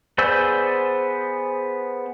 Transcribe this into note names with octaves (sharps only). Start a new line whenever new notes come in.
B3 G#4 C5 D5 E6